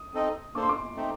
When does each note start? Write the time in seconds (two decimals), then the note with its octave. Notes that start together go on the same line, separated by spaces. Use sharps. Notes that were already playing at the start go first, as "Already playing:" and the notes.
Already playing: D#6
0.14 C4 D#4 A4 D#5
0.55 A#3 D4 A4 C5 D6
0.63 C6
0.69 D6
0.96 A3 C4 D#4